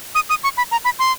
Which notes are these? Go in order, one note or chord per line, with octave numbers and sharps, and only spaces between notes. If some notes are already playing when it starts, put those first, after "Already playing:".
D#6
D#6
C#6
B5
A#5
B5
C6